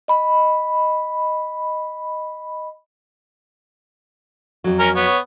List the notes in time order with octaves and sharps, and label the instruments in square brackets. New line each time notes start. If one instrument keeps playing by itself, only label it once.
[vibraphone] D#5 B5
[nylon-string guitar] F2 F#3
[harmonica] C#4 A#4 A#5
B3 C#5